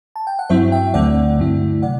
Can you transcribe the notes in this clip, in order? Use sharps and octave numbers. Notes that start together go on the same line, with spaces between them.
A5
G5
F#5
G2 F#3 C4 E4 C5 E5
E5 G5
D2 D3 A3 C4 D5 F#5
G2 D3 F#3 A3 E4
C3 D5 F#5